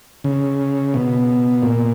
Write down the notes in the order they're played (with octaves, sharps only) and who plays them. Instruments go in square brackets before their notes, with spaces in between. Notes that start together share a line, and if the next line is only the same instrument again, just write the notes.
[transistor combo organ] C#3
B2
A#2